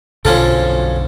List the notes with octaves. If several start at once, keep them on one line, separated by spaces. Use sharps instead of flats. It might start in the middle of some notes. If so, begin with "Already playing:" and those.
B1 F#2 D3 F3 C#4 A4